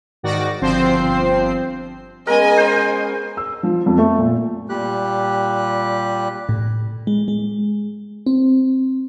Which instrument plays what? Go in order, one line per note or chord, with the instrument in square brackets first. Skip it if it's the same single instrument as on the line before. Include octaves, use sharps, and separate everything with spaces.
[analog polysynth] G#2 D#3 F#4 D5 A#6
G1 F3 C4 C5 C7
[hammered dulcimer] G#3 B3 C#4 [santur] A#4 [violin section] D#5 G#5
[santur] C5 C6
[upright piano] E6
F3
F2
A3
A#2
[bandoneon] A#2 G3 G4 F#6
[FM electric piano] A2
G#3
G#3
C4